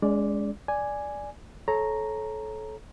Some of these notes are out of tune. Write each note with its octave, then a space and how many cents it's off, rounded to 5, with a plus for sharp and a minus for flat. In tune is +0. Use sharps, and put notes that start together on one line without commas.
G#3 +0 C#4 +45 D5 -5
D5 +0 G#5 +0
A4 -25 C#5 -15 A#5 +0